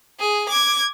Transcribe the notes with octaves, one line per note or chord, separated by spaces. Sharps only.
G#4
D6 G#6